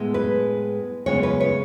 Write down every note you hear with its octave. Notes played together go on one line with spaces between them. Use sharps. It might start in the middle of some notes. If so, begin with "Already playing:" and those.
Already playing: A2 G#3 B3
B4
C#3 G#3 B3 C#5
B4
C#5